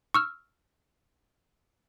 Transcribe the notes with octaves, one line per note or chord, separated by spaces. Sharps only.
C#6 E6 F6